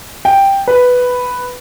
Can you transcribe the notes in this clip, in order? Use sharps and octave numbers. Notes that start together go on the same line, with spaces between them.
G5
B4